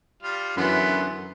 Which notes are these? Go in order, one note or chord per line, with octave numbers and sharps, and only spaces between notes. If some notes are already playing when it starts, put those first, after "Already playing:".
G3 F4 F5
F#2 D3 E3 B3 C6